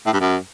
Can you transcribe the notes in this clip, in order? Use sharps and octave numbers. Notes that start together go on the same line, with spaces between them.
A2
G2
F#2